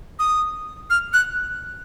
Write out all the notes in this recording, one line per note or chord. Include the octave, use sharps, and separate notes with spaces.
D#6
F6
F#6